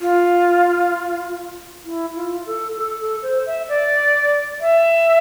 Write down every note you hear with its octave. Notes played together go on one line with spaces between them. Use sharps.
F4
E4
F4
A4
A4
A4
C5
E5
D5
E5